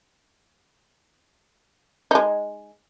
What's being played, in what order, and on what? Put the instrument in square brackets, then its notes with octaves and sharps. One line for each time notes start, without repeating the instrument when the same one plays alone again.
[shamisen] G#3 D#4